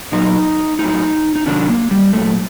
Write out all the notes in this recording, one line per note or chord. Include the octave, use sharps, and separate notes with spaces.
A#2 F#3 D#4
A2 F#3 D#4
D#4
C3 D#3 F#3 D4
A#3
G3
A#2 F#3 A3